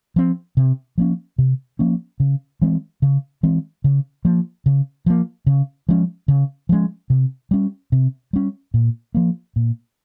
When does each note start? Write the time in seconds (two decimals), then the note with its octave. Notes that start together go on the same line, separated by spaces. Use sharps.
0.16 F3 C4
0.57 C3
0.98 F3 A#3 C#4
1.38 C3
1.79 F3 A#3 C#4
2.20 C#3
2.62 E3 G#3 C4
3.02 C#3
3.43 E3 G#3 C4
3.84 C#3
4.25 F3 A#3
4.66 C#3
5.06 F3 A#3
5.47 C#3
5.89 F3 G#3 C#4
6.28 C#3
6.69 F3 G#3 C#4
7.10 C3
7.51 G3 C#4
7.92 C3
8.33 G3 C#4
8.74 A#2
9.15 F3 A#3
9.56 A#2